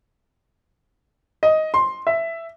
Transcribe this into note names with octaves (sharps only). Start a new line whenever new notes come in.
D#5
C6
E5